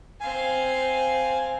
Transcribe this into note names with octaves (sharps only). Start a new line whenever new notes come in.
C4 F5 G#5